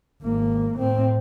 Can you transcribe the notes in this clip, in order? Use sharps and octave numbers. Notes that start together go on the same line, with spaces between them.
G#1 A#3
A2 C4